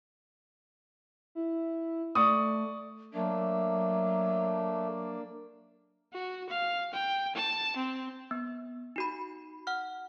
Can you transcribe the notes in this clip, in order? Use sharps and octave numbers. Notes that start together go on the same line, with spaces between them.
E4
A3 D5 C#6 D#6
F#3 A3 A#3 D4
F#4
F5
G5
A5
C4
B3
D#4 F#4 B5
F#5 F6